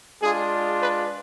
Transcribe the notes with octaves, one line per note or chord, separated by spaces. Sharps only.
G#3 D4 F4 G#4
B4